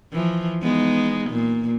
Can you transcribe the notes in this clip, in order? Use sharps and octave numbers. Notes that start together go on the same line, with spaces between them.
E3 F3
G#3 B3 D#4
A#2